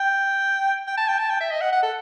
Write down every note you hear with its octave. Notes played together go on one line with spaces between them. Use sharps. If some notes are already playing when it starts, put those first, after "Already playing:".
Already playing: G5
G5
A5
G5
A5
G5
E5
D#5
F#5
F#5
A4